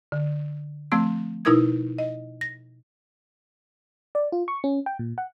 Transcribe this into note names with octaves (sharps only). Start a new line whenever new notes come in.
D3
F3 A3 C4 E6
B2 D#4 E4 A#4 D#6 G#6
D#5
A#6
D5
F4
C#6
C#4
G5
A#2
F#5